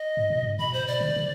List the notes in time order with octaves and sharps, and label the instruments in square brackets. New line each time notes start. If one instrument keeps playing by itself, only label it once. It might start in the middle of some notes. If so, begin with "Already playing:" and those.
Already playing: [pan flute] D#5
[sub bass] G#2
B2
G#2
[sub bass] B2 [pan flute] B5
[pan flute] C5
D5
[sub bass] D3
C3
D3